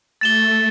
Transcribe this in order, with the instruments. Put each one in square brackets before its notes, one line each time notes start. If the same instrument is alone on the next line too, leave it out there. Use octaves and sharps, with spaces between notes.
[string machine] A3 [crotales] A6 E7 G7